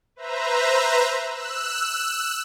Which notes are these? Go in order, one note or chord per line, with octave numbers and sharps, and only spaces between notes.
B4 C5 E5 A#5
E6 F#6